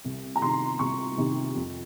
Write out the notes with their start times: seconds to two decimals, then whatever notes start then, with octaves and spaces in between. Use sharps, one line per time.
0.05 C2
0.36 A#5
0.42 C3 D#3 C6
0.79 C2 C#6
1.17 C3 D#3
1.55 F2